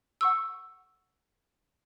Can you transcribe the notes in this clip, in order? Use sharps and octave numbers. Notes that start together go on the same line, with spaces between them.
F#5 C#6 E6